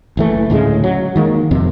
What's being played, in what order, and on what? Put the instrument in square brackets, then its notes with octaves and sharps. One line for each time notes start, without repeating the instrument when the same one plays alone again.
[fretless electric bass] F#1 E3 A3
D2 A2 C#3 G#3
F#3
D#3 G#3 A#3
F2 C3